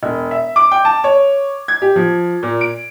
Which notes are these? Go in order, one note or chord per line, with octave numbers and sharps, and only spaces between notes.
E1
E5
D6
G5
A5
C#5
G#6
G4
F3
A#2
D7